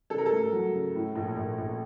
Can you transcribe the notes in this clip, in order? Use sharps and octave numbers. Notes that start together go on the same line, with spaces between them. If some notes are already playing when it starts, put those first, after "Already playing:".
C#3 A4
A#4
A4
A3
F#3
C#3
A2
A#1
A#1
A#1